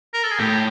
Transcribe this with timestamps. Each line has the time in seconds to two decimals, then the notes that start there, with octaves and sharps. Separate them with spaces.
0.14 A#4
0.23 A4
0.31 G#4
0.40 A2 G4